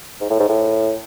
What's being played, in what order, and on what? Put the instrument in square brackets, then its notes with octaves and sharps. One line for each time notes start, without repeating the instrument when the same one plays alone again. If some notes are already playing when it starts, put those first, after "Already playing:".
[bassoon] G#2
A2
G#2
A2